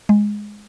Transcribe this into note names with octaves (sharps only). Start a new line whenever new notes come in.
G#3